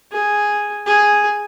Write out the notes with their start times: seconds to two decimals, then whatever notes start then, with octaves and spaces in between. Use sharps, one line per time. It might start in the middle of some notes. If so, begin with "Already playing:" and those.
0.12 G#4
0.86 G#4